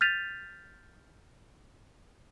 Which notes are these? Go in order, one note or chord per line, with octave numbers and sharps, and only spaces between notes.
F6 G6 A6 B6 D#7 F7